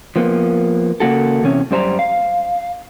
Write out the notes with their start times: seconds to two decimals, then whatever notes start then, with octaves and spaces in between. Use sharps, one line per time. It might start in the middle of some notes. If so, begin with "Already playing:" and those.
0.16 F3 A#3 B3
1.00 C#3 A#3 F#4 A4
1.43 E2 C3 C#4
1.71 F#2 G3 C5 A5 A#5
1.99 F5